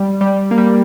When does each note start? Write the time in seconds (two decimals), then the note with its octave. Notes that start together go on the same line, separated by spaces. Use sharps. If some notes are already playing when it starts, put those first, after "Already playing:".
Already playing: G3
0.21 G3
0.51 A#3
0.58 G3